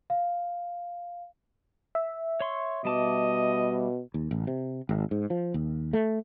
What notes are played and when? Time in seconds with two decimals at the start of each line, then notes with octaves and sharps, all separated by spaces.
0.10 F5
1.95 E5
2.40 C#5 C6 C#6
2.85 B2 G3 D#5 A5 D6
4.14 D#2
4.31 A1
4.47 C3
4.89 G#1
5.11 G#2
5.30 F3
5.54 D#2
5.93 A3